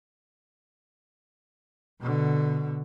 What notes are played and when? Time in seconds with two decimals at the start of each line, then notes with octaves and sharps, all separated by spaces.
2.01 B2 D3